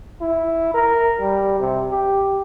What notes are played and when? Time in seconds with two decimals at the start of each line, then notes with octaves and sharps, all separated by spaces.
0.21 E4
0.74 A#4
1.20 G3
1.60 C3
1.91 G4